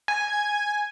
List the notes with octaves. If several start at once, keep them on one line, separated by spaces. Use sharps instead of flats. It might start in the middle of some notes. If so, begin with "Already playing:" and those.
G#5